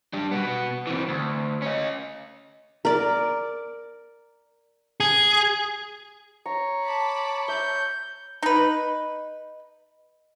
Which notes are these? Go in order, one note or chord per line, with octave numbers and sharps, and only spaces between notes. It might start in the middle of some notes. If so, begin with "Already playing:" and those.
G3 D4
B2 B3
E3 C4
D2
C#4 D#5
A#4 D5
G#4
C#5 A#5
A5 B5 D6
E5 G6
D#4 B4